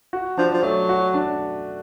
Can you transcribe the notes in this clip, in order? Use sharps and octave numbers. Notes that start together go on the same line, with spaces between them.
F#4
F3 D4
F3
F#3 A3
F#4
D4